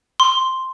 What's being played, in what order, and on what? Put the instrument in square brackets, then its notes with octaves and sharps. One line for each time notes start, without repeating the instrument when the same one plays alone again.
[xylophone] C6